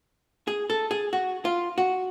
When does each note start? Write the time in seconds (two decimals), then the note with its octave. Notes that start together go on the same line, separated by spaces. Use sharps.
0.47 G#4
0.70 A4
0.91 G#4
1.13 F#4
1.45 F4
1.78 F#4